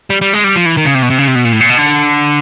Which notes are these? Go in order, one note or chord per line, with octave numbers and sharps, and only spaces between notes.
G3
G3
G#3
G3
F3
E3
D#3
C#3
C3
B2
C3
C#3
C3
B2
A#2
A2
A#2
B2
D3